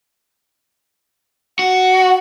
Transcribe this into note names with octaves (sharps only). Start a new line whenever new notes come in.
F#4 F#5